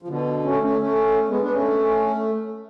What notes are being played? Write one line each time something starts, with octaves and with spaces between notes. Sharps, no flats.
F3
B2 D3
A3 C#4
A3 C#4
A3 C#4
G#3 B3
B3 D4
A3 C#4